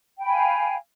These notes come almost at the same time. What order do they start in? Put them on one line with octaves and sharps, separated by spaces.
G5 B5 G#5 F5